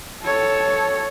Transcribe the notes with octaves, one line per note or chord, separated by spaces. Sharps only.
A4 C#5